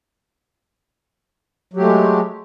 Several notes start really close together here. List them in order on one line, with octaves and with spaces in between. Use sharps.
F#3 G4 A3 G#3